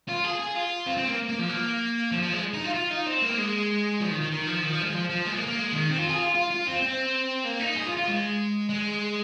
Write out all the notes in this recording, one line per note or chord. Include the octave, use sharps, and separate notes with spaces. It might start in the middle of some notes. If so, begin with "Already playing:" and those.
F4
G#4
G#4
F4
C4
C4
A#3
A#3
F3
A#3
F3
F3
G#3
D#4
F4
F4
D#4
C4
A#3
G#3
F3
D#3
D#3
D#3
F3
D#3
F3
G#3
F3
F3
G#3
A#3
A#3
G#3
D#3
C4
F4
G#4
F4
F4
F4
C4
C4
A#3
D#4
G#4
F4
F4
G#3
G#3